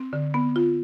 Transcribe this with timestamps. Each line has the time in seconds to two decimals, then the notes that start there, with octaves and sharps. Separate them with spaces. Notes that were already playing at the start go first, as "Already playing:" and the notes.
Already playing: C4
0.13 D3
0.34 B3
0.56 F4